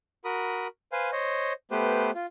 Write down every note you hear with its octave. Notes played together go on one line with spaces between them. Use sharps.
F#4 A#4 B5 D#6
B4 C5 F5 G#5
C5 C#5 D#5
A3 B3 G4 B4 C5
F4